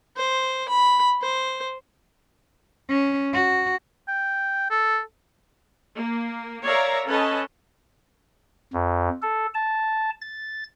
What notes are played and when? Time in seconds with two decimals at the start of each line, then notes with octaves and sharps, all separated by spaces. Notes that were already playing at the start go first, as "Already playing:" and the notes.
0.17 C5
0.68 B5
1.21 C5
2.89 C#4
3.33 F#4
4.08 G5
4.70 A4
5.95 A#3
6.63 A#4 C#5 D5 E5 F5 A#5
7.08 C#4 A4 B4 D#5 A5
8.73 F2
9.22 A4
9.55 A5
10.21 A6